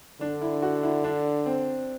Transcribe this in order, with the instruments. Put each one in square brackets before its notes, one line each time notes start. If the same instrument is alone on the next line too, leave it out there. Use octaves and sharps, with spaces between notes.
[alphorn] D3 [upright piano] D4
[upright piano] E4
F#4
E4
D4
C4